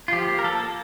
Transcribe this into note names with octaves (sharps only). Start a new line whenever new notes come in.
F4
F3 G4
A#3
A#4
F3 A4
A#3